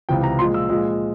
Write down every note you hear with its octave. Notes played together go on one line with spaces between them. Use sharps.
C#2 C3 E3 G5
A#5
A#2 F3 G#3 C6
E6
A#2 F3 G#3